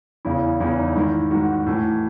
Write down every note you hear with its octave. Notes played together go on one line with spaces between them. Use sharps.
E2 C#3 E3 E4
E2 C#3 E3 E4
D#4
G#2 D#3 E4
G#2 D#3 F#4
A2 E3